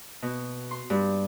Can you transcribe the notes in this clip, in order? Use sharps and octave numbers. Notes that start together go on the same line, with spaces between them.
B2
C6
G2